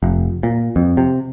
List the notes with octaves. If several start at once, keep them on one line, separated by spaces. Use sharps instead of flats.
F1
A#2
F2
C3